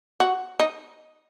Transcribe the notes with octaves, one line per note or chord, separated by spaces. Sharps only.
F#4
D#4